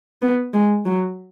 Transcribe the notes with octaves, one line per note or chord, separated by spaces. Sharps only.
B3
G#3
F#3